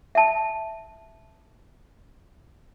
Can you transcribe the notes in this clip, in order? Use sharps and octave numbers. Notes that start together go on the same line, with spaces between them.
E5 A5